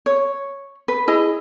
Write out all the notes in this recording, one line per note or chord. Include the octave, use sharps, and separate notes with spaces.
C#5
B4
E4 G#4 D#5